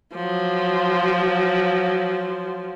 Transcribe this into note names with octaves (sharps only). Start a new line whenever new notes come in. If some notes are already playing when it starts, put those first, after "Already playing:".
F3 F#3